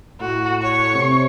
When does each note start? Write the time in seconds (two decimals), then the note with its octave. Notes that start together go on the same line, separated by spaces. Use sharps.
0.20 A2 F#4
0.63 C#5 C#6
0.94 C3